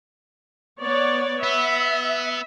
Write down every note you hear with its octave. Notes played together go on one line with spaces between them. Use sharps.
B3 C#5 D5
B3 E5